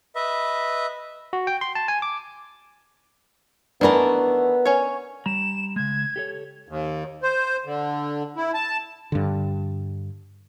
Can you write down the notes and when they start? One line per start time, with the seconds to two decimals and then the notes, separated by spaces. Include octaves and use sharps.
0.15 B4 D#5 E5
1.33 F#4
1.47 G5
1.61 C6
1.75 A5
1.88 G#5
2.02 D6
3.81 D#3 E3 A3 B3 D4 A#4
4.65 C#4 C#5
5.26 G3 A#5 E7
5.76 C#3 G#3 G#6
6.16 G4 A4 C#5
6.69 D#2
7.23 C5
7.65 D3
8.36 E4
8.54 A5
9.12 G2 D3